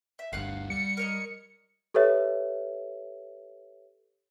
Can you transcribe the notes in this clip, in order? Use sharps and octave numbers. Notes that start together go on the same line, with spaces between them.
E5
G1 D2 G2 F5 F#5 F#6
G3 C#7
A#4 C#5 D#5
G4 A4 B4 C#5 E5